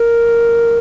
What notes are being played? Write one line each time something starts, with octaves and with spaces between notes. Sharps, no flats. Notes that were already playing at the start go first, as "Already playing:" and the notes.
Already playing: A#4
E2 D3 G3